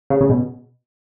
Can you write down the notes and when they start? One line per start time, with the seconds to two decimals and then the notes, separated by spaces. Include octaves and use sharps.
0.10 C#3
0.21 C#3
0.29 B2